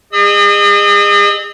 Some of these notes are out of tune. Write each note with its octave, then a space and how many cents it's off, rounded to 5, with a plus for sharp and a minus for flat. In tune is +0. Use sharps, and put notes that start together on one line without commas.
G#4 -35 D#5 -40 E6 -45